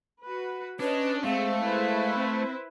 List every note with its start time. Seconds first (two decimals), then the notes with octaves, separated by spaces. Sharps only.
0.23 F#4 B4
0.80 C#4 D4 B4 C#5 D#5
1.24 G#3 A3 C4 F5
1.62 E4 B4 C5
2.16 C4